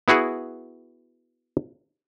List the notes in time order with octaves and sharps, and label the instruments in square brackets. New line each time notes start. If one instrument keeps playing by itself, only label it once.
[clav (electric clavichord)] B3 E4 F#4 G#4